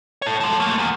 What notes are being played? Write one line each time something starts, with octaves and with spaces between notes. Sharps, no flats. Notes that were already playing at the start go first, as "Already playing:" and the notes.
A4 C#5
F3 G#3
A3 A#3
E2